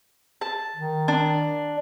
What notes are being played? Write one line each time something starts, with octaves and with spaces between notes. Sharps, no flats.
A5
D#3
D4